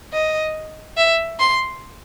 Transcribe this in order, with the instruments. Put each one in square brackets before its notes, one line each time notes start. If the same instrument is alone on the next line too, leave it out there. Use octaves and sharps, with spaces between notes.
[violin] D#5
E5
C6